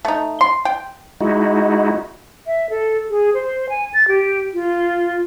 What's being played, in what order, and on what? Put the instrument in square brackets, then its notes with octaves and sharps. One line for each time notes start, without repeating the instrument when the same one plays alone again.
[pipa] A3 D#4
C6
G5
[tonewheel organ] G#3 D#4 E4 F#4
[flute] E5
A4
G#4
C5
G#5
A6
G4
F4